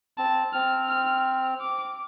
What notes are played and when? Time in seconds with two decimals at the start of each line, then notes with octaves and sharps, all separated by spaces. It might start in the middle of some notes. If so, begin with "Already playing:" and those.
0.17 C4 A5
0.53 C4 F6
0.89 F6
1.61 D6